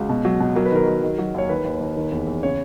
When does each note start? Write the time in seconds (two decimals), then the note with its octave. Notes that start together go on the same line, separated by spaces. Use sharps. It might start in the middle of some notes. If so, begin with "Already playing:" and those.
Already playing: C#2 F#4
0.09 B2
0.25 F#3
0.40 B2
0.55 F#3 A#4
0.66 B4
0.71 D#3 A#4
0.87 F#3
1.03 D#3
1.18 F#3
1.34 D#2 C#5
1.49 D#3 B4
1.64 D#2
1.81 D#2
1.97 D#3
2.12 E2
2.27 E2
2.43 C#3 C#5